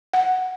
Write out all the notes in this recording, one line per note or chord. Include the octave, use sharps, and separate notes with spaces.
F#5